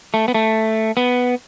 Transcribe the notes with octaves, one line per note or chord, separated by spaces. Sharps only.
A3
B3
A3
B3